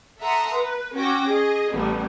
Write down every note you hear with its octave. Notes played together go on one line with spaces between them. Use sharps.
A4 E5 F#5 A#5 C6 D#6
B4
C#4 F#4 G5 D6 A#6
G#4 D#5
A1 G3 B3